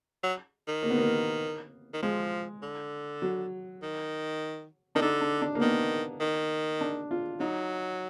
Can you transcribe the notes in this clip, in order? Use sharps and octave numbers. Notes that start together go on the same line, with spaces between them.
F#3
D#3
A#3
B3
A#3
D#3
F3 G#3
D3
F#3
D#3
D#3 D4
D3 D#4
D4
D4
A#3
D#3 B3
D#3
D4
F4
F#3 D#4